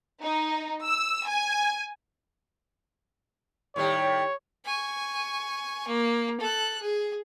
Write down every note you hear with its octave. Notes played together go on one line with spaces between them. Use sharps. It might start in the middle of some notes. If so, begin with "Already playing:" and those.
D#4
E6
G#5
A2 D#3 G3 C#5
G#5 C#6
A#3
A4 F#6
G#4